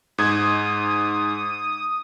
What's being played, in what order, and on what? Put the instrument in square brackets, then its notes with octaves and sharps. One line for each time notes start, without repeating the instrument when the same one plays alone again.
[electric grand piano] G#2 G#6 [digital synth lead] D#6